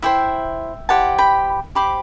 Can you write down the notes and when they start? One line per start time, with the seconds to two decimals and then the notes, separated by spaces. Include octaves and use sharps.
0.02 E4 G4 C5 E5 G5
0.89 E4 G4 C5 F#5 A5
1.18 G5 B5
1.75 G4 C5 B5 D6